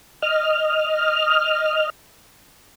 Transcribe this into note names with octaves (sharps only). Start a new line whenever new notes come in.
D#5 F6